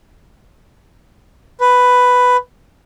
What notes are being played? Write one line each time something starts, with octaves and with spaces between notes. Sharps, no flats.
B4